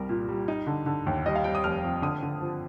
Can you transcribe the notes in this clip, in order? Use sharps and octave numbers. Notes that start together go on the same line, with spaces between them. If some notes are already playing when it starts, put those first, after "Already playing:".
Already playing: C2 G3 A#4
A#2
G3
D#4
D3
D3
D#2
G3 D#5
F5
G3 G5
D#6
F1 F6
F2
D3 D#6
D3
F3